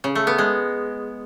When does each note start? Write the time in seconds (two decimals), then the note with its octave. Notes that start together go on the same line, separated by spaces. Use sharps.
0.04 C#3
0.15 A3
0.27 B3
0.38 G#3